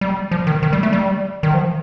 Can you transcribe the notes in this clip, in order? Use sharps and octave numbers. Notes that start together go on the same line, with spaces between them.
G3
F3
D#3
D#3
G3
A3
G3
D#3
F3